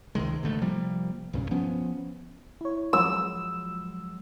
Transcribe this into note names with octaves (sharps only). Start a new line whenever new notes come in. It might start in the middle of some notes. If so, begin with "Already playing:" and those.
C#2 C3 D#3 G#3
A1 D3 A3
C3 F3 G3 A#3
B1 G2 A#2 C#3
F3 B3 C#4
E4 C#5
F3 F#3 G#3 E6